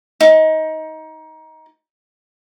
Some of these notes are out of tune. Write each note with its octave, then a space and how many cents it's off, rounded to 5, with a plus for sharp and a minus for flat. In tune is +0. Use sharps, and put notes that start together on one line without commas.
D#4 +20